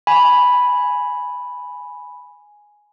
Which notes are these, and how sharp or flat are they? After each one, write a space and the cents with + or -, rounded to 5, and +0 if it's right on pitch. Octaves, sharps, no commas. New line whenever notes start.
G#5 +0 B5 +0